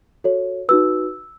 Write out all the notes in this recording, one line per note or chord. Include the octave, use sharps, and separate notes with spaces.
F#4 A4 C#5
D#4 F#4 B4 E6